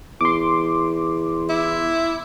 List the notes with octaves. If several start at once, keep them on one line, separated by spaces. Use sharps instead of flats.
E2 C6 D6
E4